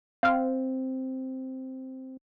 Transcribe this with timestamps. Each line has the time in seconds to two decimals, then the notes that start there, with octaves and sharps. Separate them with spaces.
0.23 C4 F5 F6